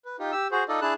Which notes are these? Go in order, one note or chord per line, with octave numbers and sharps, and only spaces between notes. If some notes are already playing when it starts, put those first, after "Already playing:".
B4
D#4 F4 G4
G4 E6
F#4 G#4 C5
D#4 F4 A4 D5 D#5
D4 E4 G#4 A5 F#6